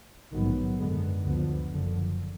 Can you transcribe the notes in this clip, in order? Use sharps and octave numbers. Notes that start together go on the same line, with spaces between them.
A#1 G#2 D#3 F#3 B3
F#2 D3 G#3 B3
D2 D3 F3 B3
F#1 F#2 D3 F3